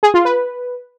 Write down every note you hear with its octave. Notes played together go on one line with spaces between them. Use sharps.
G#4
F4
B4